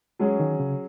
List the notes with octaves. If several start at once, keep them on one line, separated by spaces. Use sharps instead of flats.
F#3 G#3 C#4 G#4
D#3
C#3